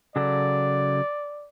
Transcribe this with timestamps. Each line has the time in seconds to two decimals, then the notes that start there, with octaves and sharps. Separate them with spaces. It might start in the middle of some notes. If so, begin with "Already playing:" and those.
0.16 C#3 F#3 A4 D5